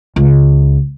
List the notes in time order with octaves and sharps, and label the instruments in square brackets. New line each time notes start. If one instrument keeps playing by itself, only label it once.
[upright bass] C#2